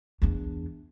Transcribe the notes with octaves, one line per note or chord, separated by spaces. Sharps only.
E2 D4